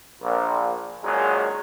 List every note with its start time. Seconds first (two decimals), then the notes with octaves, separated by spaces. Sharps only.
0.22 A#1
1.02 G#1 A#2 F#3 G#3 C#4 G#4